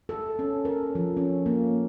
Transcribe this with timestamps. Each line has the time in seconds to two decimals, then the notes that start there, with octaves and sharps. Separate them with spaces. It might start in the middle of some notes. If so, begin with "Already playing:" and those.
0.09 A4
0.39 C#4
0.65 A#4
0.95 F3
1.17 C#4
1.46 A#3